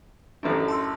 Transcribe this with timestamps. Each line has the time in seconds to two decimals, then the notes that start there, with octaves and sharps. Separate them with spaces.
0.43 A1 F#2 A3 D4 A4
0.68 A5 C6 E6